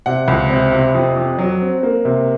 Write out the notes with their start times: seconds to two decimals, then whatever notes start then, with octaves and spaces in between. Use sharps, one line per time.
0.06 C3 F#5
0.28 C#2
0.50 C3
0.73 C3
0.95 F2
1.16 F2
1.38 F#3
1.61 C4
1.83 A#3
2.05 C3